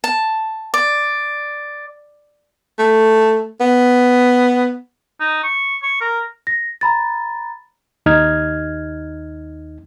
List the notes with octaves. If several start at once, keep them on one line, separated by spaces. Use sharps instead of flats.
A5
D5
A3
B3
D#4
C#6
C#6
A#4
A#6
A#5 B5 A6
D#2 D#4 F6 G#6